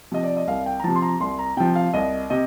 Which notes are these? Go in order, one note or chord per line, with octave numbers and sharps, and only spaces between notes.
C3 F3 D#5
D5
D#5
C2 F5
G5
A#5
C3 F3 A5
C6
A#5
C2 C6
A#5
C3 F3 G5
F5
C2 D#5
C3 D#5